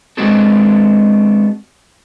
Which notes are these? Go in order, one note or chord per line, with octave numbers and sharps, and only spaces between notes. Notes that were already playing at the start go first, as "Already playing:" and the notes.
G#3 B3 C4 D4 F#4 A4